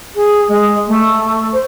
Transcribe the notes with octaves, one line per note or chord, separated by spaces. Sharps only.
G#4
G#3
A3
C5